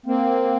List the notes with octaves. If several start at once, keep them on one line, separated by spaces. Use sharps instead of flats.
A#3 C4